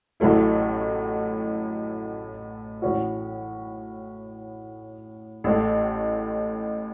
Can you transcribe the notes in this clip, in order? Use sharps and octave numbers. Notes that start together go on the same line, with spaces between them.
A1 A2 F#3 A3 E4
A2 E3 C#4 F#4
A1 A2 A3